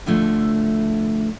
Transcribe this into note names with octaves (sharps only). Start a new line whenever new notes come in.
A2 D3 F3 A3